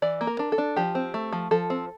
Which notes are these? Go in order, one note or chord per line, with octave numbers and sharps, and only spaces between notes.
E3 D5
A#3
A#4
D4
A4
D4
F3 G4
C4
A3
F3
F3 A4
C4